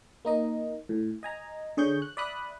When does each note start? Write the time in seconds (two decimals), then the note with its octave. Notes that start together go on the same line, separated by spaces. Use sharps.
0.25 A#3 D#4 D#5
0.89 A2
1.23 D#5 G#5 A#5
1.77 D3 G#4 C#5 C#6 G6
2.02 F#6
2.17 D5 E5 B5 D#6 F#6